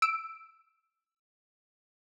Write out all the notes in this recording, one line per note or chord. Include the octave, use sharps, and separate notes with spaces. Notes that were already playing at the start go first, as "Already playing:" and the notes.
E6 D7